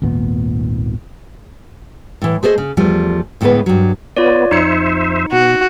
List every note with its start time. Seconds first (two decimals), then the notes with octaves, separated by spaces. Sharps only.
0.02 G#1 D#2 A#2 B3
2.22 A2 E3
2.43 A3 G#4 C5 C#5 D#5
2.58 C#3
2.77 E2 F3 G3 A3
3.41 D2 A2 D3 G#3 B3 B4
3.66 G2 F#3
4.17 B3 F4 C#5 D5
4.51 F2 D#4 C5 E5 C#7
5.32 B2 F#4